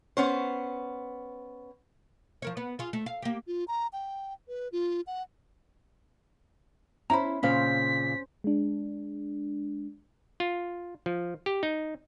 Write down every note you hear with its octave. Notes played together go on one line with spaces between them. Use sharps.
B3 C#4 C5
F3 A#4 C#5
B3
F4 G#4
A3
F5
A#3 G4
F4
A#5
G5
B4
F4
F#5
C#4 E4 C5 A#5 B5
A#2 C#3 C#4 C5 F5 B6
G#3 D4
F4
F3
G4
D#4